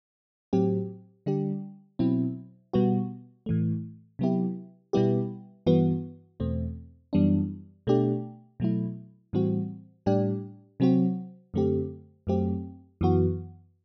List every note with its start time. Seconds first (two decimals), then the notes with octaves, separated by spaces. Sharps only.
0.53 A2 F#3 C4 G4
1.26 D3 G3 D4 G4
1.99 B2 F#3 C4 E4
2.73 B2 G3 B3 F#4
3.46 A2 E3 A3
4.19 C3 F#3 B3 E4 G4
4.93 B2 G3 B3 E4 G4
5.66 G2 E3 B3 F#4
6.40 E2 B2 A3 C4
7.13 F#2 E3 G3 B3 D4
7.87 B2 A3 D4 G4
8.60 B2 F#3 A3 E4
9.33 A2 E3 G3 C4 F#4
10.06 A2 G3 D4 G4
10.80 C3 F#3 C4 F#4
11.54 F#2 D3 A3 C4 G4
12.27 F#2 F#3 A3 C4 G4
13.01 F#2 E3 B3 F#4